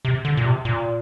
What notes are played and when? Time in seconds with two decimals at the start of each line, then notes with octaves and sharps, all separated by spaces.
0.05 C3
0.25 D3
0.37 A#2
0.45 C3
0.65 A#2